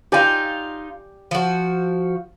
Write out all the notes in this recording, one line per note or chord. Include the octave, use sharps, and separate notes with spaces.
D#4 F4 G4 D5 G#5
F3 F#4